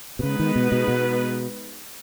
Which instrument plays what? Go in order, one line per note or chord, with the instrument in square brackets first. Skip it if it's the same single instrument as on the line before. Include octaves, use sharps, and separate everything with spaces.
[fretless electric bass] B2
[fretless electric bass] C#3 [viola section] G#3 B3 D#4 B4
[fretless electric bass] D#3
B2
B2
B2